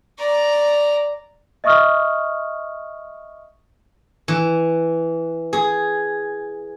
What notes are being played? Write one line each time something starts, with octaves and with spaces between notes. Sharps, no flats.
D5 A#5
D#5 E5 C#6 D#6 F6
E3
G#4